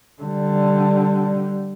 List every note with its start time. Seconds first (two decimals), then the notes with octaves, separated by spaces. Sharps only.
0.22 D3 G3